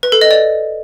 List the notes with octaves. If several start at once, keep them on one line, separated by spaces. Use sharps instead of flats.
B4
A4
D#5
D5